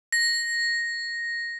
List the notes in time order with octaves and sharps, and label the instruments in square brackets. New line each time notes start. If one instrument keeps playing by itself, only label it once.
[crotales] A#6